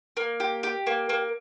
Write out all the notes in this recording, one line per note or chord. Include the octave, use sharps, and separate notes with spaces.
A#3
G4
G4
A#3
A#3